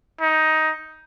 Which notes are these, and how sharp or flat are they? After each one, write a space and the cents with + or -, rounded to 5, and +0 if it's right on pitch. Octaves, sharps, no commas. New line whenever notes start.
D#4 +10